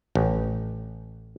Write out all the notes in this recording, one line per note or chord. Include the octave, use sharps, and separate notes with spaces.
A1